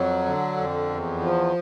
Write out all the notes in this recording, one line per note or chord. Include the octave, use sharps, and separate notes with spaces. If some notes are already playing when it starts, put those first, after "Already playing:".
Already playing: F2 F#3
D3
F2
E2
F3